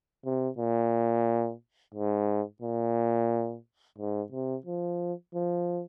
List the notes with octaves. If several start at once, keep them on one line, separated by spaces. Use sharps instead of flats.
C3
A#2
G#2
A#2
G#2
C3
F3
F3